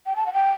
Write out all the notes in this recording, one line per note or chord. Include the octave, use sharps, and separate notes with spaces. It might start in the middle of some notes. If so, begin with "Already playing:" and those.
G5
A5
F#5
G5